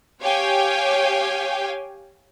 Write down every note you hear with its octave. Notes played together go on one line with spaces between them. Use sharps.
G4 C#5 F5 G5 G#5